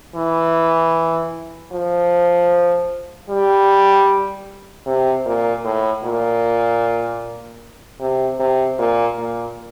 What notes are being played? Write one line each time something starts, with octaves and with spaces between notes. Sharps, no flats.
E3
F3
G3
C3
A#2
A2
A#2
C3
C3
A#2
A#2